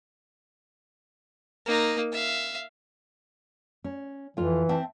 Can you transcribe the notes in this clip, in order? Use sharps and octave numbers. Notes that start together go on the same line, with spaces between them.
A#3 D#4
E5 F5
C#4
F2 E3 F4
C4 E5 A5